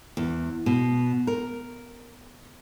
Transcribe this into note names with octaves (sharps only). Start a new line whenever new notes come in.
E2
B2
A#4